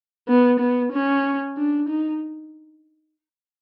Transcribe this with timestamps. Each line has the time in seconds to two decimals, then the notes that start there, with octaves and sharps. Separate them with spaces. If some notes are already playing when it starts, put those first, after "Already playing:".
0.28 B3
0.60 B3
0.92 C#4
1.57 D4
1.89 D#4